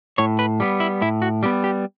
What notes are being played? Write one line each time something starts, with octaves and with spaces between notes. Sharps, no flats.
A2 C#5
B4
G3 B3
E4
A2 E4
F#4
G3 B3 G4
G4